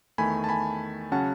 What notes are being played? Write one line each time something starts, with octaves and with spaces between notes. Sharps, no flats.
E2 D#3 A3 G#5 B5
A5
G#5 B5
C#3 F#3 C#4 F#5 A5